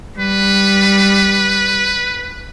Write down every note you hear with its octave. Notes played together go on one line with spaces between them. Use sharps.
G3 B4